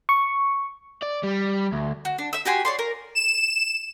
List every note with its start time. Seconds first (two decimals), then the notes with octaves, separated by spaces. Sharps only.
0.09 C#6
1.03 D5
1.24 G3
1.73 D2
2.05 F#4
2.18 D4
2.33 E5 E6
2.45 F#4 G4 G#5 C6
2.65 C#5 D5 C6
2.79 A#4
3.15 E7